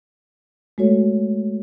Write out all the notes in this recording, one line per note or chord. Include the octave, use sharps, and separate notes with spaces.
G#3 A3 F#4 A4 C#5